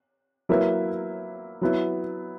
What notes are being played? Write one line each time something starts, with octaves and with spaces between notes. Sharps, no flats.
F#3 A#3 E4 B4 E5
F#3 B3 E4